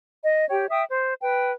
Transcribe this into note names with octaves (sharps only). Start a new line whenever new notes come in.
D#5
G4 C#5 G5
E5 G5 D#6
C5
B4 G5